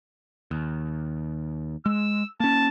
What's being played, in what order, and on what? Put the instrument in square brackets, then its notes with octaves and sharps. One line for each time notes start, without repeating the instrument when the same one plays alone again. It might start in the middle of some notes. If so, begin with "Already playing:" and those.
[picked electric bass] D#2
[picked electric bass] G#3 [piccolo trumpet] E6
[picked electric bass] A#3 C#4 [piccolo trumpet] A5